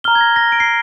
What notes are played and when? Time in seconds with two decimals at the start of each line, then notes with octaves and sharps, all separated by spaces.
0.04 A#5 F6 G7
0.15 G#6
0.21 A#6
0.36 A#6
0.52 D7
0.60 C7